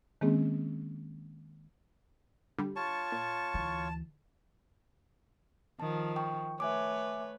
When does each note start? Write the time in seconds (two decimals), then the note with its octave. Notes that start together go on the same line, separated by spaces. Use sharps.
0.21 D#3 G#3 A#3 C4 C#4 G#4
2.59 D3 G3
2.76 F4 C#5 A5 C#6
3.12 A#2
3.54 D2 E3
5.80 D#3 F3 A5
6.16 G5 C#6
6.60 A3 B4 C#5 E5 G#5 D6